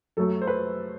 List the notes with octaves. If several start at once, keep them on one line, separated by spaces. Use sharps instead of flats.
F#2 F#3 A3 A4
C5
B4